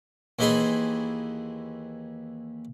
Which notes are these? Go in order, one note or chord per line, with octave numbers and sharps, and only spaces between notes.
D#2 E3 D#4 G#4 B5 C6